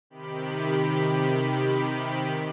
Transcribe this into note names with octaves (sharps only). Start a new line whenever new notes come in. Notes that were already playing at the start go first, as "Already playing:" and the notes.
C3 D#3 G4 B5